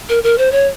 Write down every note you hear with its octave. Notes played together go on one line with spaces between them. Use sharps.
A#4
A#4
C5
C#5